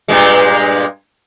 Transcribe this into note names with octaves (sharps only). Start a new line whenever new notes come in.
G2 A#2 G#3